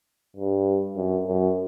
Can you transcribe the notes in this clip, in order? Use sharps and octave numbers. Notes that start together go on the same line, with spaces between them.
G2
F#2
F#2